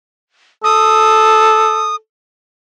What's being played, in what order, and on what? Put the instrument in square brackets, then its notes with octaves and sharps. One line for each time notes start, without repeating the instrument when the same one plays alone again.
[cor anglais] A4 [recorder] D#6